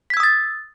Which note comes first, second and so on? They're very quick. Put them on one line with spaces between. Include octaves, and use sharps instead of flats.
B6 G#6 E6 D#6 A6